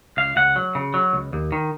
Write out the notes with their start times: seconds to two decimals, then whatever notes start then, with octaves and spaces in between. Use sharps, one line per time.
0.17 C#2 F5
0.36 C#2 F#5
0.56 F#3
0.75 C#3
0.94 F#3
1.13 C#2
1.33 D#2
1.52 D#3